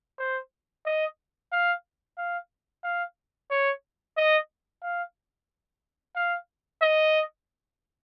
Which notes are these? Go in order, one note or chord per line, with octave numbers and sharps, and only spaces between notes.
C5
D#5
F5
F5
F5
C#5
D#5
F5
F5
D#5